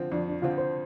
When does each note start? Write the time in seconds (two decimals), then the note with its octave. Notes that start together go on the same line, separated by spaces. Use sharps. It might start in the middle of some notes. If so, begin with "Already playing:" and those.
Already playing: D3 F3 C4
0.12 F2 D4
0.28 D4
0.42 D3 F3 C4 F4
0.58 C5